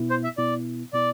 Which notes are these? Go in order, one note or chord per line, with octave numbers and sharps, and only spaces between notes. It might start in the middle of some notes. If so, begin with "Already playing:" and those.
Already playing: B2 B3 E4
C5
E5
B2 B3 E4 D5
B2 B3 E4 D5